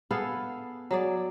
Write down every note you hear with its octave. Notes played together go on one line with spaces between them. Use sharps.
B3 G#4 A4 F5
F#3 G#4 D5